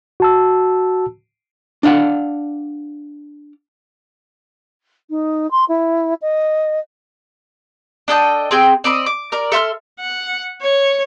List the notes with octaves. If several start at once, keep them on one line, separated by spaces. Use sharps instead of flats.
F#4 A5 E6
D4 D5 F5 F#5
D#4
C6
E4
D#5
D4 A4 D#5 G5
C4 G#4 G5
C4 D5 D#5 B5
D6
A#4 D5
A4 E5 C6 F6
F#5
C#5